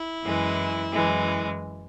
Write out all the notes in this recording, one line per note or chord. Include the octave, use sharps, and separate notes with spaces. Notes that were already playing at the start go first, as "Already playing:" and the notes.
Already playing: E4
F#2 E3 G#3
F#2 E3 G#3